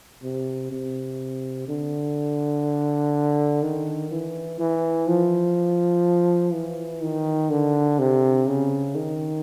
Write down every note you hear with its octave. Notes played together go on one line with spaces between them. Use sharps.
C3
C3
D3
D#3
E3
E3
F3
E3
D#3
D3
C3
C#3
D#3